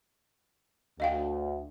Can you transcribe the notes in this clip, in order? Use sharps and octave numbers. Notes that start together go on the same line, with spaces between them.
D2 D#5 F5 G5